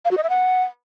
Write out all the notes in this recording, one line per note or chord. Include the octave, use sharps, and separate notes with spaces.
F5
F#4
D#5
E5
F#5